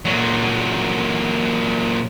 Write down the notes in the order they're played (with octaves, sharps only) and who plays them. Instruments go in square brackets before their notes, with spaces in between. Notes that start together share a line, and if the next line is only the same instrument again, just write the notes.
[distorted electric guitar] A#2 F#3